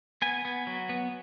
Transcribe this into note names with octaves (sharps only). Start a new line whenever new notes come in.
B3 G#5
B3
F#3
B3